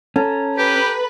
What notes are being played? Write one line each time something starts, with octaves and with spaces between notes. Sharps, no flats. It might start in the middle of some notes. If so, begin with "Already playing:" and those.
C#4 A4 A#5
G4 B4